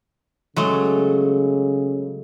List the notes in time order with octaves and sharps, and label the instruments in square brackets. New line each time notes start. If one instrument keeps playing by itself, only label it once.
[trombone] C#3 [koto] F#3 G#3 A3